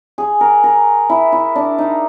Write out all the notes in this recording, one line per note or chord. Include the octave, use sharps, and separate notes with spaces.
G#4
A#4
A#4
E4
E4
D4
D#4